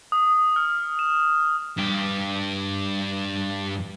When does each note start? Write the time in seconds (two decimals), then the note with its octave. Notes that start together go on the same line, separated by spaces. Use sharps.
0.12 D#6
0.56 F6
0.99 E7
1.77 G2 G4